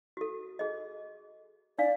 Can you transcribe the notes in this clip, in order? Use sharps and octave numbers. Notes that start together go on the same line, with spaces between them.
F#4 A4
G#4 D#5
D4 D5 F5